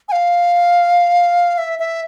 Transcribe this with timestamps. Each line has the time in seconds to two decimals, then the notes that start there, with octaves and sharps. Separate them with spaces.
0.09 G#5
0.12 F5
1.58 E5
1.79 E5